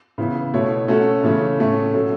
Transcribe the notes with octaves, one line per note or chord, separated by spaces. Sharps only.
C#3 E3 B3 E4
B2 A3 E4 C#5
A3 C#4 F#4 A4
C#3 E3 A3 C#4
A2 A3 C#4
B2 F#3 C#4 A4